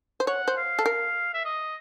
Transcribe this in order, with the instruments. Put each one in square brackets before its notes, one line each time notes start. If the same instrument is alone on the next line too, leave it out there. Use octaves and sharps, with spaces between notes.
[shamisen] C5
[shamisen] C#5 [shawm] F#5
[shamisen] C5
[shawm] F5
[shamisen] A4
A#4
[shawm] E5
D#5